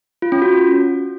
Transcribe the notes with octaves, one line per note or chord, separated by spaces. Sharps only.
F4
C#4
F#4